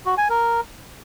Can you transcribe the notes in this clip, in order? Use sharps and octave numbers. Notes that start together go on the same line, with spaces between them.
F#4
G#5
A#4